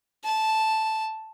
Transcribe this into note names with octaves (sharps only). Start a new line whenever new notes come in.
A5